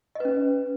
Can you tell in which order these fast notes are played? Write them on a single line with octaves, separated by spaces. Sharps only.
D#5 B4 C#4